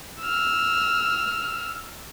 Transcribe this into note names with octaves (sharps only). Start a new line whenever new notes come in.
E6 F6